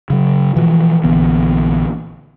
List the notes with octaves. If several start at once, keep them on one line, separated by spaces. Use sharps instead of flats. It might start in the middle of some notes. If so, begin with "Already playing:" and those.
C#3 F#3
B2 E3 F3
A#1 D3 E3 B3